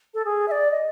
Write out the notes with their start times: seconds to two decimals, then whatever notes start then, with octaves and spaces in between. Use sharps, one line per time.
0.14 A4
0.25 G#4
0.48 E5
0.51 D5
0.71 D#5